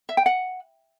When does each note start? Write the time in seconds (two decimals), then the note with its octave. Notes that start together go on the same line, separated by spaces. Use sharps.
0.09 E5
0.17 G5
0.26 F#5